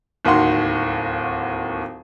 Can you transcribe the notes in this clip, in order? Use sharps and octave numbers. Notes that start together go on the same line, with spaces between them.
D1 D#2 D#3 F#4 F#5 C6